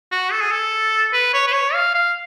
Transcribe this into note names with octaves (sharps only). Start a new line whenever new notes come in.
F#4
A4
G#4
A4
B4
C#5
B4
C#5
F5
F5